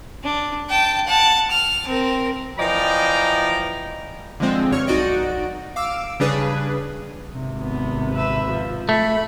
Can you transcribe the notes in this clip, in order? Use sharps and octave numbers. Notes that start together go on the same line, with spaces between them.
D4
G5 A5
F#5 A5
F6
C4 A#4
E3 F3 D5 D#5 G5 A#5
D3 F3 G#3 C4
G2 C#5 F6
B1 D#4 F#4 D5 D#5 D7
F5 D6 E6
C#3 G3 D4 G#4 B4
G#1 C3
B3
B4 E5
F3
A3 B5